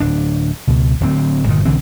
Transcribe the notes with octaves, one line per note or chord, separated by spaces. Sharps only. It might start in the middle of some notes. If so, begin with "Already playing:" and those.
D1 D4
C#2 B2
D1 D2 C4
G1 A#2 D#3
B1 D3 E3 C4